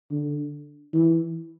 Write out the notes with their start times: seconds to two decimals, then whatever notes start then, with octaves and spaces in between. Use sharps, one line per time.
0.11 D3
0.93 E3